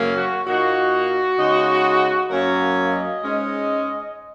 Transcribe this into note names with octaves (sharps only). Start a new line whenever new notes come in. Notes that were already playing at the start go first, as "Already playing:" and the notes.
Already playing: F#2 C#3 F#3 A#3 C#4
F#4
A#2 A#3 D#4 F#4
C#3 G#3 D#4
F#2 F#3 A#3 C#4 A#4
D#5
G#2 G#3 C#4